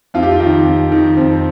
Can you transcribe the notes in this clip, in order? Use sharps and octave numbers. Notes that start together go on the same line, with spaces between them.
F2 F4
G4
F4
D#3
F2
D#3
F2 C4